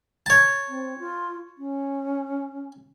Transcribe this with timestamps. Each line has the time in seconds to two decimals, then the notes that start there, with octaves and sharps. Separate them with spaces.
0.26 C#5 A5
0.68 C4
0.99 F4
1.58 C#4